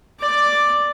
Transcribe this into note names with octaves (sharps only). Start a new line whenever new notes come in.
D5 D6